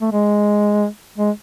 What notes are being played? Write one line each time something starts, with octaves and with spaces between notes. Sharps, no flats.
A3
G#3
G#3